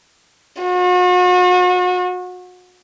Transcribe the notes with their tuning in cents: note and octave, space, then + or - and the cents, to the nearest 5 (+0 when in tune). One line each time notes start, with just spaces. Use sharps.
F#4 -40